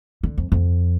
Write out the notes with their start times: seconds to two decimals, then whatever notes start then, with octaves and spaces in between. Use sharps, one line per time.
0.23 D3
0.38 F2
0.52 F2